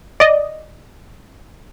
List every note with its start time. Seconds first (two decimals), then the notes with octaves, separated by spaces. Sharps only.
0.20 D5 D#5